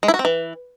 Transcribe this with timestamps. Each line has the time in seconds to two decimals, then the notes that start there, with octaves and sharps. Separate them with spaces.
0.03 G#3
0.08 E4
0.14 F#4
0.19 C4
0.25 E3